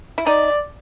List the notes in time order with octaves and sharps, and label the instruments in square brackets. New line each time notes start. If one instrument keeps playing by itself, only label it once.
[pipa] E4
[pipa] D#4 [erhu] D5